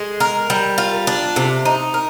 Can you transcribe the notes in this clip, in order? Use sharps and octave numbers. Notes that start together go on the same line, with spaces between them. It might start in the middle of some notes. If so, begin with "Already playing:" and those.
Already playing: G#3
A#4
G3
F4
D4
C3
D#4
A#4